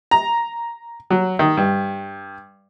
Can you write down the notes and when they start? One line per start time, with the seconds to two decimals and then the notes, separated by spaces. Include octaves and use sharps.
0.11 A#5
1.10 F#3
1.39 D#3
1.57 G2